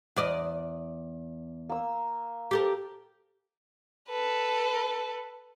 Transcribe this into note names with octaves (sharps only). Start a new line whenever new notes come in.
E2 D5 D#5
A#3 E6
G4 A4 A#4
A4 B4